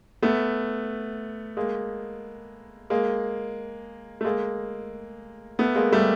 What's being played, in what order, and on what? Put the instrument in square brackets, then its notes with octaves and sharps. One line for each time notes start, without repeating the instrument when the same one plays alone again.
[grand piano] A3 B3
G#3 A#3
G#3 A#3
A3
G#3 A#3
A3 B3
G#3 A#3
G3 A3